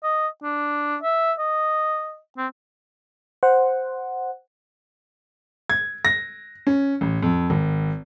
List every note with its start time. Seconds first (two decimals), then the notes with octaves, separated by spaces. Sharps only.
0.03 D#5
0.43 D4
1.02 E5
1.39 D#5
2.37 C4
3.43 C5 F#5
5.70 G#6
6.05 A#6
6.67 C#4
7.01 A1
7.23 F2
7.50 G#1